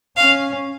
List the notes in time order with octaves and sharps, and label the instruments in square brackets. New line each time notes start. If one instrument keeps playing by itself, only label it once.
[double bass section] C#4 [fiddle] F5